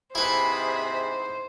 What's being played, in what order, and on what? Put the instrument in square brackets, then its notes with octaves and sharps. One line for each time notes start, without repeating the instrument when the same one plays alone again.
[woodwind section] G#2 C3 [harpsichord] E4 B4 [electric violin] G#4 B5 [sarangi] C5